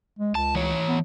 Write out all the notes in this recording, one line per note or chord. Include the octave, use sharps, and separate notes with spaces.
G#3
C#2 A5
E3 C#5
B3